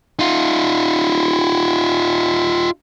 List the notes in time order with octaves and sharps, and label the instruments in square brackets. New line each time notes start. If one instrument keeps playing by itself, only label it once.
[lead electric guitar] D#4 F4